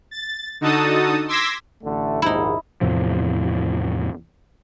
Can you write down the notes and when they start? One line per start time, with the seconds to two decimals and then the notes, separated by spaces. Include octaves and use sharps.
0.11 A6
0.61 D3 D#4 F#4 A4 A5 D#6
1.28 C6 D6 E6 G#6 A#6 B6
1.82 A1 D3 A3
2.22 A#1 D#2 G#2 D#4 E4
2.81 E2 A2 C3 F3